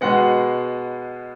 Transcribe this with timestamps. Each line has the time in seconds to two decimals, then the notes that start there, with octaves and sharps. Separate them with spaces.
0.01 B2 G#3 B3 F#5